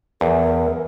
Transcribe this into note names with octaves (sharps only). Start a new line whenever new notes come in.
E2 A#4